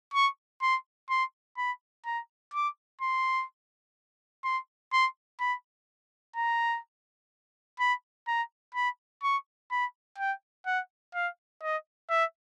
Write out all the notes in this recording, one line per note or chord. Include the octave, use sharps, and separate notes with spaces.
C#6
C6
C6
B5
A#5
D6
C6
C6
C6
B5
A#5
B5
A#5
B5
C#6
B5
G5
F#5
F5
D#5
E5